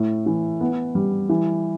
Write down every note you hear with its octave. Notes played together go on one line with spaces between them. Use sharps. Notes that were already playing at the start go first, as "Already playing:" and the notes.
Already playing: A2
E3
B3
G3
E3